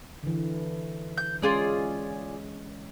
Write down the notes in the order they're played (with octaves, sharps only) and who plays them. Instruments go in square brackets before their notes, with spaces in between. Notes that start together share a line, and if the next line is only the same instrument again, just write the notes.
[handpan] D3 E3
[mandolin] G6
[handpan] G#3 C#4 [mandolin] F4 G#4 D5